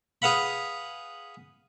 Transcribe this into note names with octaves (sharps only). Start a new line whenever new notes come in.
G#4 B4 F5 F#5 B5